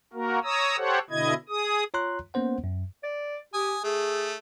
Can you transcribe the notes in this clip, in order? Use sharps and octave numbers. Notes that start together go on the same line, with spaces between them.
A#3 F#4 A#4
C#5 A#5 D#6 E6
G4 A4 C5 C#5 F#5
B2 D3 E4 D#5 G#6
G#4 D#6
F4 C#5 A#5 C6 F#6
A#3 B3 C#4 C5 F#5
F#2
D5
G4 G#5 D#6
A3 G#4